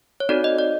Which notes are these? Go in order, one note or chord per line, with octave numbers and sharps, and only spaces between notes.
C#5
C4 D#4 F#4 A4 D5
D#5
D5